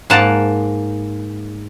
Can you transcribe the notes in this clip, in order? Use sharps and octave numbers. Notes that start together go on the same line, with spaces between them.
G#2 A#3 F#5 A5